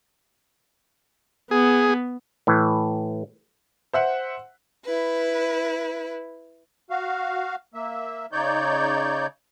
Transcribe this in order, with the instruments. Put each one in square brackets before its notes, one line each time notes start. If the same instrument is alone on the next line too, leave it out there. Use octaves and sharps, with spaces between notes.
[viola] B3 [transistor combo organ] G#4
[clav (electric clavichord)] A2 E3
[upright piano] C5 E5 F#5
[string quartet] E4 B4
[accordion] F#4 F5
A#3 E5
C#3 D#4 C#5 D5 G6